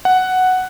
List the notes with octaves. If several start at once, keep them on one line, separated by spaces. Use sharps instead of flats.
F#5